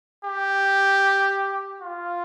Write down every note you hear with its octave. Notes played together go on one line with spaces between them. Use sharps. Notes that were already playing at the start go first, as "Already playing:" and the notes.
G4
F4